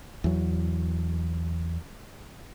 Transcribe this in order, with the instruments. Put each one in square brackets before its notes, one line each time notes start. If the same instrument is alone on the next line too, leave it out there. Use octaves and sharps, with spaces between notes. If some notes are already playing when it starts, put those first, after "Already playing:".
[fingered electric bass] E2 F#3